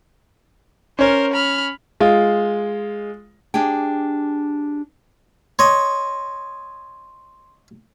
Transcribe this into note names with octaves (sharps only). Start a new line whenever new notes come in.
C#4 A#4 C5 C#5
B5 F6
G#3 F4
D4 G4 G#4 G5
C#5 D#5 C6